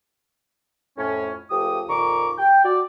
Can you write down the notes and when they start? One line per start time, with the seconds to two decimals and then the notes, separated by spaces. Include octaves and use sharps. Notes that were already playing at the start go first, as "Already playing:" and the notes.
0.98 F2 A2 C#4
1.51 C#2 F3 A3 G4 D#6
1.89 F2 A#2 D#3 A#5 C#6 D6
2.38 G5
2.65 F#4 D5